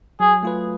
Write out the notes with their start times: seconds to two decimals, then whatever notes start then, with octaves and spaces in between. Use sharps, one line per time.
0.20 F#3 G#4
0.43 A3 F4 B4